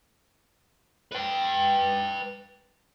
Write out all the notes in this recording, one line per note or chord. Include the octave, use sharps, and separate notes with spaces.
B4 G5